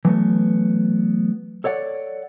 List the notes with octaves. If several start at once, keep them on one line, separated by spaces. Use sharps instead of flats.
E3 F#3 A3 B3
A4 C#5 D5 F#5